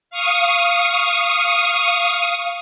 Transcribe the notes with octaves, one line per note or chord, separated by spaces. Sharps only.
F5 C#6 D#6